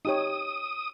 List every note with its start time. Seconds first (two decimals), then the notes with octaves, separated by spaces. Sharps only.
0.05 D#4 G4 C#5 D#6